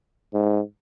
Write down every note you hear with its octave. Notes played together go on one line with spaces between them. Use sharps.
G#2